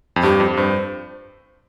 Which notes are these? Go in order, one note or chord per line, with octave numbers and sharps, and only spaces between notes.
F2
G2 G4
F2
G2 C5